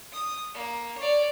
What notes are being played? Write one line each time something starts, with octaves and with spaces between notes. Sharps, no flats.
D#6
A#3
C#5 D5